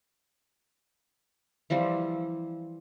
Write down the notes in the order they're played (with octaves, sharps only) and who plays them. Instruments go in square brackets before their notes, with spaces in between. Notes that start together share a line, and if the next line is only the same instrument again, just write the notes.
[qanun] E3 F3 G3 C4